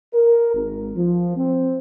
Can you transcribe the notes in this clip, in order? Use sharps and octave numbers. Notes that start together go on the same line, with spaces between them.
A#4
G#1
F3
C4